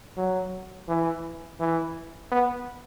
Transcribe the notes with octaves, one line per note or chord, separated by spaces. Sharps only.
F#3
E3
E3
B3